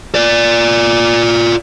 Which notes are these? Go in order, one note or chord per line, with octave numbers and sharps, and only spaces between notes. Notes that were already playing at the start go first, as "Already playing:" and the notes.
F4 D5